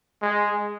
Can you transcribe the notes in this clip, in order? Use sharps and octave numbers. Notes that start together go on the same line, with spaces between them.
G#3